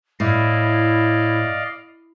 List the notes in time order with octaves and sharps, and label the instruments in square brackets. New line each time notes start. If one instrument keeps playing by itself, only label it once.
[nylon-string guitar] A2 [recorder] E4 [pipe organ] D5 D#5 F5